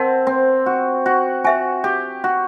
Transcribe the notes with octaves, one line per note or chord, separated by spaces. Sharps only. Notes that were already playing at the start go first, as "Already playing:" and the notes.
Already playing: C4 A#4 D#5 F#5 A5 C6
C4
F#4
F#4
F#4 C5 E5 G#5
G4
F#4